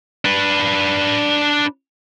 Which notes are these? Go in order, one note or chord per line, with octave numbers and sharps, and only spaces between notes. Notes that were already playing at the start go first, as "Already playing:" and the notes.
D4 B4